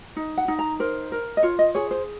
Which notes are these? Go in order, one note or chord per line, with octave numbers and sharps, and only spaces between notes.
D#4
F#5
D#4
A#5
A#4 C5
A#4
D#5
F4 C#5
D#5
G#4 C#5
C5